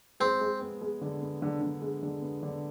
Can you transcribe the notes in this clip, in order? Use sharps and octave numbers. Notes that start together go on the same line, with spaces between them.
G#3 C4
G#3
B3
G#3
D3
B3
D3
D3
G#3
D3
B3
D3